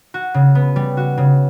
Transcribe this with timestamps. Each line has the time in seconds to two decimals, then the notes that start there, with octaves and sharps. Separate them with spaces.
0.14 F#4
0.34 C#3
0.55 B3
0.76 G3
0.97 F#4
1.18 C#3